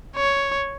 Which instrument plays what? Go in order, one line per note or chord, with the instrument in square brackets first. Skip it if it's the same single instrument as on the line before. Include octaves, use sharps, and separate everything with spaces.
[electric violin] C#5